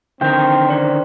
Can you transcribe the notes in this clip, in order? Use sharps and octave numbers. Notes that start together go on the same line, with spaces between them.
D3 D#3 C4 A#4 G5
C#4 C5 D5